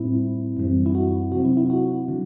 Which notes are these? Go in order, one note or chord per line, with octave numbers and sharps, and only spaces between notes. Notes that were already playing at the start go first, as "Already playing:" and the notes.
Already playing: A2 G3 C4 E4
F#2 E3 G3 C4
E4
F#4
C3 F#3 C4 F#4
E4
E4
F#4
D3 F#3